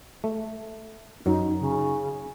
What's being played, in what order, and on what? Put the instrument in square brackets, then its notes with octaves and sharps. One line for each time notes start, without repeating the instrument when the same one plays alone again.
[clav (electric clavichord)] A3
[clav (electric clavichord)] F#2 F#3 [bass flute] D#4
[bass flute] C#3